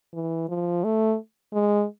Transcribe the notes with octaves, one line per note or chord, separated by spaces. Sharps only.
E3
F3
A3
G#3